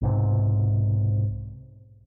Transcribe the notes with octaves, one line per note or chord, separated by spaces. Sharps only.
B1 G#2 C3